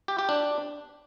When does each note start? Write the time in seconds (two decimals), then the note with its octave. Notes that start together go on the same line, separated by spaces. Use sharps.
0.08 G4
0.19 G4
0.29 D4